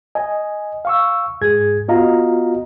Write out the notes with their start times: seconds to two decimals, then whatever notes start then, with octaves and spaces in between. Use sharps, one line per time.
0.15 D#5 G#5
0.85 F5 C#6 E6
1.41 G#2 G#4 G#6
1.88 B3 F4 F#4 D#5 F5 A#5